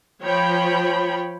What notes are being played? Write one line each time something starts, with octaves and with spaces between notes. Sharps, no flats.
F3 C#5 G5 B5